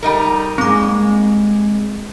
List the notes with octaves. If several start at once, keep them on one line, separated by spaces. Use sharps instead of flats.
G3 D#4 A#4
G#3 A#3 C4 D6